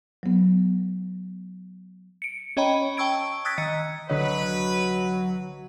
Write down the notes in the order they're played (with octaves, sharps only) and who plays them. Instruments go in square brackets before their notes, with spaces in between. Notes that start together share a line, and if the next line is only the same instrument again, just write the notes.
[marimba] F#3 B3
[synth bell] C#7 D7
C#4 C#5 D#5 G5 A#5 B5
G5 A5 C#6 E6 G#6 D7
D#6 E6 F#6 G#6 A6 B6
D#3 D#5 C#7
[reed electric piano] C2 D3 D#5 [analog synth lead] F#3 [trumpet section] B4